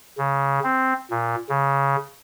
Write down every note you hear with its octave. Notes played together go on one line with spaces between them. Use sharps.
C#3
C4
A#2
C#3